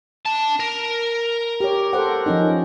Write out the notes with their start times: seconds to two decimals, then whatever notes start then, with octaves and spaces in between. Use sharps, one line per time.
0.26 D4 A5
0.60 A#4
1.60 G4 C#5
1.93 A4 C5 F#5
2.26 F3 C#4 D#4